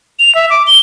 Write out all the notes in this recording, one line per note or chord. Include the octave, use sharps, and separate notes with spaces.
F7
E5
D6
G7